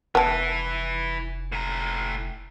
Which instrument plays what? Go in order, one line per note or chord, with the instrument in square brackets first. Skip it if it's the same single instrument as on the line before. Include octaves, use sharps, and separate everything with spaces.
[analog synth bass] F1 [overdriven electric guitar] E3 E4 [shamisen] B3 A5
[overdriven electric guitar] A2 A#5